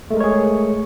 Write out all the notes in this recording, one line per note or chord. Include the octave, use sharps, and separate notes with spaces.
G#3 A3 G#4 A#4 C#5